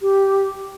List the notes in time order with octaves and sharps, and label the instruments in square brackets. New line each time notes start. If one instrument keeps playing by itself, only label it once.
[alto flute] G4